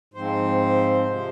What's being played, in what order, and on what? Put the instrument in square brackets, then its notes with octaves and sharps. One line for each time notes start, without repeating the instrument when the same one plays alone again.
[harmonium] G#2 F3 C4 C5
C3 F3 G#3